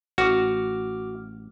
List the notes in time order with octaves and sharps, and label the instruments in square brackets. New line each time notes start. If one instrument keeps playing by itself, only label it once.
[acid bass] A1 [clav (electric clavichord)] F#4 [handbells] D6 F6